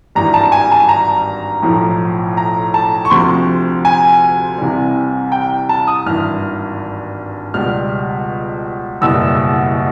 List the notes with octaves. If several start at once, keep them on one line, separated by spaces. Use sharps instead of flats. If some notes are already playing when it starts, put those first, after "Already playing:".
G#1 G2 E3 G3 A#5
A5
G#5
A5
A#5
B1 A2 F3
A#5
A5
C#6
D2 C3 F3 C6
G#5
C2 C3 E3 G3
G5
A5
D#6
G#1 G2 E3 F6
C#2 B2 G3 F6
F#1 E2 B2 G3 E6